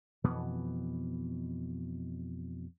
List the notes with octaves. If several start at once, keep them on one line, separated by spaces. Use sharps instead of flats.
F2 B2 E3 B3